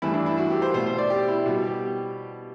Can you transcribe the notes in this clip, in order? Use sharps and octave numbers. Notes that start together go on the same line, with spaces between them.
G2 E3 A3 E4
D4
E4
F#4
G4
C5
B2 A3 C5
C5
D5
G4
E4
B2 G3 F#4
G4